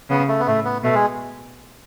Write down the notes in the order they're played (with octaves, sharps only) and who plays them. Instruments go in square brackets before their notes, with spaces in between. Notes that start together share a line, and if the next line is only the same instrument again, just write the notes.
[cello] C#3 [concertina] B3
[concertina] A3
B3
[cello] A2 [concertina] A3
[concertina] B3
[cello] B2 [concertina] A3
[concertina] G#3